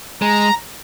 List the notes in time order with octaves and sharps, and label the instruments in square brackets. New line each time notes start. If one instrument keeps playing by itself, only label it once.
[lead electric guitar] G#3 [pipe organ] A#5